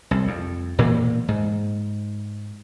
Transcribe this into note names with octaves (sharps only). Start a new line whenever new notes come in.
C2
F2
E1 A#2 E3 A#3
G#2